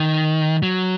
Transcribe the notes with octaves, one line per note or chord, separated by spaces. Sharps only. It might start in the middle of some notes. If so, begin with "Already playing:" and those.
Already playing: D#3
F#3